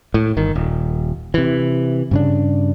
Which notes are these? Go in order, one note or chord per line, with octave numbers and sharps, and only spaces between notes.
A2
G1 D#3
D#1
C3 E3
G2 C#3 D4